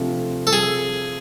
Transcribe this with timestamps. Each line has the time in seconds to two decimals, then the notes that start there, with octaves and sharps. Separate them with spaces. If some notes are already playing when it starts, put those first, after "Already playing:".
Already playing: C3 F3 A3 D4 F4
0.47 A4
0.53 G#4